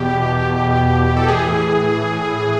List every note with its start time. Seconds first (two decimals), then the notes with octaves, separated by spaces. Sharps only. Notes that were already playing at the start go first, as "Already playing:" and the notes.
Already playing: E2 B2 G4
1.16 A4
1.27 A2 E3 G#4